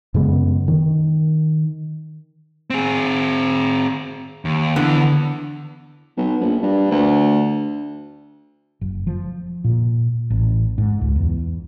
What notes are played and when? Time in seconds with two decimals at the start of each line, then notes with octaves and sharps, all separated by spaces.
0.14 F#2 C#3 G#3 B3
0.68 D#3
2.70 C4 G#4
4.45 D#2
4.76 D3 E3 B3
6.17 B1
6.41 A#1
6.62 G2
6.91 D2
8.81 F#1
9.07 F3
9.64 A#2
10.30 A1
10.78 G#2
11.01 C#2
11.16 E2